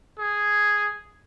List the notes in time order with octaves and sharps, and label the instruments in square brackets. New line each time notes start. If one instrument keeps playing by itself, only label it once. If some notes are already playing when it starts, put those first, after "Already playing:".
[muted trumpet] G#4